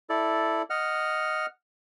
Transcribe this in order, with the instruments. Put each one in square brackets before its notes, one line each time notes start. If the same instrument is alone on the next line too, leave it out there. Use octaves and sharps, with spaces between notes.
[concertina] E4 A4 D5
D#5 F#5 F6